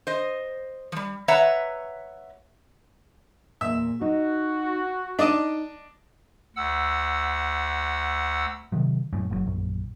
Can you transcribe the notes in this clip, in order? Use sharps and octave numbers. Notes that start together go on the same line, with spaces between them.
C5 D#5
F3 G3
B4 C#5 E5 F#5 A#5
E2 A#2 E5
D#4 F#4
D4 D#4 D5 D#5
D2 F#5 E6
C3 D#3 F#3
F#2 A2
F#1 A#2 F#3
A#1 F#2